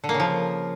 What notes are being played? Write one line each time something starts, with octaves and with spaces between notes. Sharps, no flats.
D3
A#3
C#3
F3